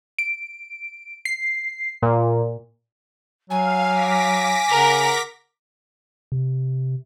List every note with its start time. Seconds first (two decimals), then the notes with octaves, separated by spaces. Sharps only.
0.19 D7
1.25 C7
2.02 A#2
3.50 F#3 F5 G#5
3.89 D6 A#6 B6
4.70 C#3 A#4 F#5
6.32 C3